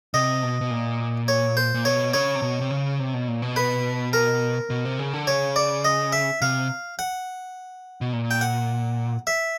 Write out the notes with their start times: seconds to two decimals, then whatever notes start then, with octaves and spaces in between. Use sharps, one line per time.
0.14 C3 D#5
0.43 B2
0.61 B2
0.71 A#2
1.28 C#5
1.57 C5
1.74 A#2
1.85 B2 C#5
2.14 C#3 C#5
2.35 C3
2.42 B2
2.61 C3
2.71 C#3
3.00 C3
3.14 B2
3.28 A#2
3.42 B2
3.56 B4
4.13 A#4
4.70 B2
4.85 C3
4.99 C#3
5.13 D3
5.27 C#3 C#5
5.56 D5
5.85 D#5
6.13 E5
6.41 C3 F5
6.99 F#5
8.01 B2
8.13 A#2
8.31 G5
8.41 F#5
9.27 E5